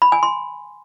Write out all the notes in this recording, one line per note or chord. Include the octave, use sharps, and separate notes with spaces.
B5
G#5
C6